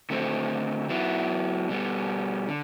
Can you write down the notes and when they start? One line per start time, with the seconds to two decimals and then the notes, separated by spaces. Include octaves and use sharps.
0.10 D3 A3 C4
0.89 F#3 B3 E4
1.69 B2 G3 B3
2.48 D3